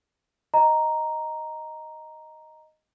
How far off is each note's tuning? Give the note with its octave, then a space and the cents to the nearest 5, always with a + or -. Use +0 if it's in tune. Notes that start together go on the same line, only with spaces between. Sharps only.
D#5 +0 A#5 +0